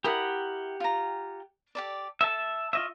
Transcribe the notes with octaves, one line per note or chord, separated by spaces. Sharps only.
E4 G4 A#4 F#5 D#6
F4 A#5
G4 A4 D5
A4 E5 A5
F4 D#5 E5 C#6